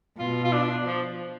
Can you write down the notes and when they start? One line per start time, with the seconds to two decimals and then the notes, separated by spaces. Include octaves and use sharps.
0.18 B2 F4
0.44 F4
0.53 D4
0.85 F3